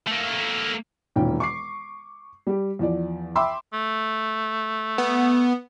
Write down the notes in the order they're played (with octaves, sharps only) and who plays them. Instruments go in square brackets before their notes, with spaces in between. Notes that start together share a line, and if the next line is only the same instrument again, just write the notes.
[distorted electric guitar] A3 A#3
[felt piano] E1 A#2 D#3 C#4 G5
C#6 D6 C7
G3 G4
E2 F3 D5
E5 G5 B5 C6 D6 E6
[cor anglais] A3
[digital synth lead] B3